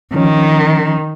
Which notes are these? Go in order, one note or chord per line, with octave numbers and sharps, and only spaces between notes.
D#3 F3 C#4